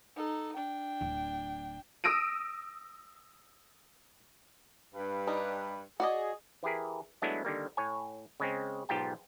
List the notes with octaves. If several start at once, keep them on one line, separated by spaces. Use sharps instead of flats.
D#4 A4
D4 G5
D1
D#6 E6 A#6 D7 D#7
G2 B4
G3 D4 D#4
F#4 G#4 D5 D#5
E3 E4 G4 G#4 A#4
F#3 G#3 A3 B3 D4 E4
D3 D#3 G3 A#3
A2 C#5 G#5
C#3 G#3 C4
B1 G#2 F4 G4 G5 A5